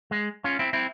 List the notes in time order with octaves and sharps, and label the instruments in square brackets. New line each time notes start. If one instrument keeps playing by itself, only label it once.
[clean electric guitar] G#3
C#4 F4
C4 E4
C4 E4